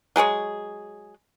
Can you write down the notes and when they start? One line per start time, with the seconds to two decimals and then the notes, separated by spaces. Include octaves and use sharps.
0.16 F#3 G#3 G#4 C#5